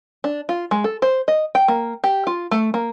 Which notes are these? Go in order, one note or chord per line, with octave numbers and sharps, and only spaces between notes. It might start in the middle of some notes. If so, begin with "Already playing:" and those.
D4
F4
G#3
A4
C5
D#5
G5
A#3
G4
F4
A3
A#3